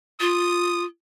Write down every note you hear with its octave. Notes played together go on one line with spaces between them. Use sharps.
F4 D#6